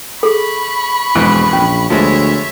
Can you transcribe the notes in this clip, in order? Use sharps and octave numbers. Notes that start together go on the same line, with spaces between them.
G#4 A4 B5 C#6
E1 F2 G#2 E3
A#1 C#4
D2 F3 G#3 B3 C#5 E5